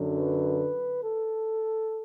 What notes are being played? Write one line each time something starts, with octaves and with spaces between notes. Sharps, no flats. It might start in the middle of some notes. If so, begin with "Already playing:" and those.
Already playing: F#2 D3 F#3
B4
A4